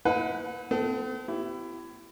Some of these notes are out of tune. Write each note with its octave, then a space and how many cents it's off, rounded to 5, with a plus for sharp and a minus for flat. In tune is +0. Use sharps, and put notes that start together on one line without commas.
E4 -45 B4 +20 F#5 -35
C4 -45 A4 -5
E4 +20 G4 -30